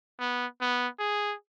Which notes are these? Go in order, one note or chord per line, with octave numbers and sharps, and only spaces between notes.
B3
B3
G#4